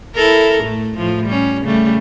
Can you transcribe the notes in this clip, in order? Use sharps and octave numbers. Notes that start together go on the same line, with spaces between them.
E4 A4 A#4
A2 A3
A2 F3
G3 C#4
C#3 G3 A3